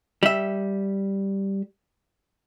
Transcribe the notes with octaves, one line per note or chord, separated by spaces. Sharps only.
G3 E5